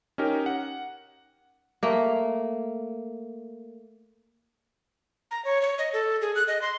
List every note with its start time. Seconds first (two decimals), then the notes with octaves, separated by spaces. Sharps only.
0.18 C#4 D#4 G4 A#4
0.46 F#5
1.83 A3 A#3
5.31 A#5
5.45 C#5
5.62 C#5
5.78 D#5
5.93 A4
6.21 G#4
6.35 F#6
6.48 D#5
6.62 C6